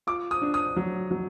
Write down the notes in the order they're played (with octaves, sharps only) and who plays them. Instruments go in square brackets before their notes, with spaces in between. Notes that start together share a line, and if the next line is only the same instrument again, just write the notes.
[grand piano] F4 D6
D#6
D4
D#6
F#3
F#3